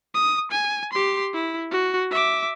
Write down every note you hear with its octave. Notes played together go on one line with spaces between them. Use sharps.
D#6
G#5
G4 C6
E4
F#4
E5 D6